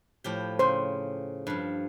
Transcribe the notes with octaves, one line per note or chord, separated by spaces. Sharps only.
A2 F3 G4
C#3 C5
G2 F3